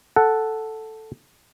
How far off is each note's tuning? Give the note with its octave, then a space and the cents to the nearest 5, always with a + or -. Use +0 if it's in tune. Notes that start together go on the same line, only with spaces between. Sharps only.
A4 +0 F#5 +0